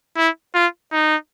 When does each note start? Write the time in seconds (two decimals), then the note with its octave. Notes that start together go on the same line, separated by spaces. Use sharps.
0.17 E4
0.55 F4
0.93 D#4